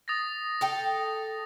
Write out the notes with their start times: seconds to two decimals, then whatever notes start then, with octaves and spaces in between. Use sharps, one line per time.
0.08 D#6 A6 A#6
0.61 A4 G5